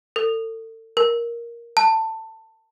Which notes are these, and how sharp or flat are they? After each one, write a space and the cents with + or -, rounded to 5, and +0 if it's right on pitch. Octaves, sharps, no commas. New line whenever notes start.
A4 +35
A#4 +10
A5 +20